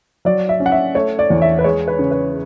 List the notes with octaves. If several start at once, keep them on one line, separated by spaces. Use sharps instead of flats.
F#3 D5
E5
C#4
F#5
E5
A3 C#5
D5
E2
E5
B4
G#3 C#5
B4
C#3
B4